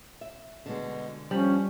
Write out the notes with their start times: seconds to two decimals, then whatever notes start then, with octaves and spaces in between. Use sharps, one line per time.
0.21 E5
0.66 B2 D3 G#3
1.31 F3 G3 C#4